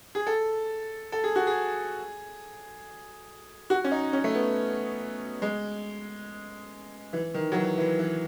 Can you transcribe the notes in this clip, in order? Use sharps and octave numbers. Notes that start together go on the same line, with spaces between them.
G#4
A4
A4
G#4
F#4
G#4
F#4
C#4
D#4
C#4
A3
B3
G#3
E3
D#3
F#3
E3
E3
E3